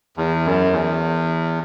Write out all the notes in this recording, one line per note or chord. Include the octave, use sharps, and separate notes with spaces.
E2
F#2
E2